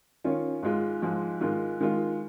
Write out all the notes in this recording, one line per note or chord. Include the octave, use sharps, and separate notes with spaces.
D#3 C#4 F4
G#2 G#3 F4
G#2 F3 G#3
G#2 D#3 G#3 F4
D#3 G#3 F4